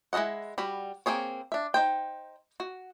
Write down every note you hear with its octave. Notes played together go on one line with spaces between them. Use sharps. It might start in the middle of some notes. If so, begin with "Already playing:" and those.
G#3 E4 A4 D#5 F#5
G3 F#4 B5
A#3 C4 G#4 C#5
D4 E5
D#4 C5 G5
F#4